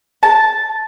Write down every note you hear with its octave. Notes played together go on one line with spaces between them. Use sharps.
A5